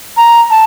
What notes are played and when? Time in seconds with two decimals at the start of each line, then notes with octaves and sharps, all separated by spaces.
0.17 A#5
0.51 A5